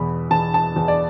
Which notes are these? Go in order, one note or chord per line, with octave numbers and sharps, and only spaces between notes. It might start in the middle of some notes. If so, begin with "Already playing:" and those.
Already playing: E2 B2 B5
E2 A5
A5
E2
D5